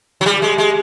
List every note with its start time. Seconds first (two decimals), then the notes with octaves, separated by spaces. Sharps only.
0.21 F#3
0.26 G3
0.42 G#3
0.58 G#3